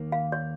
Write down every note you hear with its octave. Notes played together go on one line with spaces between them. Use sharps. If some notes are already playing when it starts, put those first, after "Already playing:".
Already playing: D#2 D#3 A#3
F5
C#5